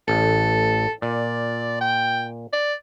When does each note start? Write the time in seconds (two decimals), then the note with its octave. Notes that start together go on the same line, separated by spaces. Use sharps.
0.08 A1 A4
1.02 A#2 D5
1.81 G5
2.53 D5